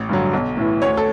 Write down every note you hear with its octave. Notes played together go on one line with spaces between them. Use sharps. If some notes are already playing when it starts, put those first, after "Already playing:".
Already playing: A1
G2 D3 F#3
B1
A2 E3
D2 C#5
A4